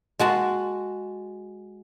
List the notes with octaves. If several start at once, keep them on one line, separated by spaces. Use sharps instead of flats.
G#3 F#4 A5